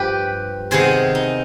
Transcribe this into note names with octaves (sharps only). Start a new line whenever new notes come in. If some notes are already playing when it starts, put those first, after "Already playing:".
Already playing: G2 F3 G4 B4
C3 D#3 B3 G#4 C5
D#4